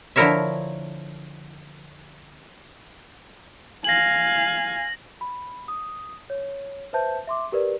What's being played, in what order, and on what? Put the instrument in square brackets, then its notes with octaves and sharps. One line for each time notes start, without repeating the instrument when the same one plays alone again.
[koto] D3 F3 E4 A#4 C#5 E5
[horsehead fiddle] F5 G#5 [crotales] A#6 F#7
[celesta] B5
D#6
C#5
B4 C5 E5 A5 G6
E5 C6 D6
G4 A#4 B4 D5